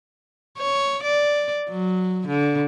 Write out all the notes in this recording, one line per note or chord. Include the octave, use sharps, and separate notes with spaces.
C#5
D5
F#3
D3